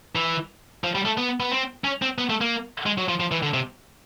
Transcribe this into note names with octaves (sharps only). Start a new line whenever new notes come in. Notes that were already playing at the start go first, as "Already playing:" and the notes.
E3
F3
G3
A3
B3
B3
C4
C#4
C4
B3
A3
A#3
G#3
F#3
F3
F3
E3
D3
C3